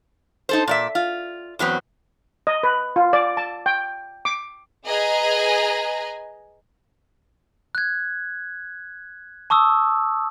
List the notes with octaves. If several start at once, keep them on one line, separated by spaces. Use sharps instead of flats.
D#4 A4 C5
A#2 D5 E5
F4
E2 F#3 B3 C4
D#5
B4
F4
D5
A5
G5
D6
G#4 B4 D#5 G#5 A#5
F#6 G#6
A5 C#6 D#6 E6